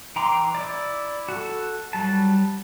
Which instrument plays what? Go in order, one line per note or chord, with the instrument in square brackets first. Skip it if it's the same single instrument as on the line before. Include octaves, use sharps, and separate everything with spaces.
[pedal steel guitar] E3 G5 A#5 C6 D6
E4 D5
F#4 A4
F#3 G3 A5